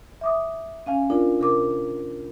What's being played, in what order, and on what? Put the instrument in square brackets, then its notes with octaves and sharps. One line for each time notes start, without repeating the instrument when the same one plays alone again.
[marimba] E5 D6 D#6
C#4 F5 G#5
D4 F4 A#4 D5
C3 A#4 D6